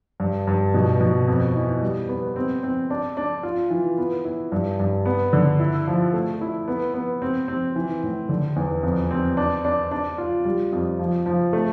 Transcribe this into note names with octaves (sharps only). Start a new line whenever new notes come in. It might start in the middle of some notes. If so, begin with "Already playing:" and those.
G2
G2
B2
B2
F2
E3
G3
B3
C4
C4
D4
D4
F4
E3
B3
E4
G2
G2
B3
D3
E4
F3
A3
E4
B3
B3
C4
C4
E3
A2
D3
E2
F2
C4
D4
D4
D4
F4
G3
F2
F3
F3
A3